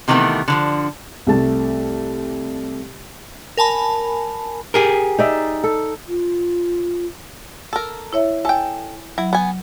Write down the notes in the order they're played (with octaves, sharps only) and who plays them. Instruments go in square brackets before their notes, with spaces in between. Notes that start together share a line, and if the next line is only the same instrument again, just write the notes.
[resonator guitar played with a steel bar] C3 D#3 E3 G#3 A3 B3
D3 E3 F3
[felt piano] C2 A3 A5
[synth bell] A#4 G#5 A5 B5
[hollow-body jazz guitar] G4 G#4 A#4
[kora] D#4 D5 E5
A4
[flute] F4
[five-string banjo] A4 A#4
[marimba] E4 C#5 E5
[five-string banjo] A4 G5 [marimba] G#5
[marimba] F#3 [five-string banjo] E4
[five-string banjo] B3 G#5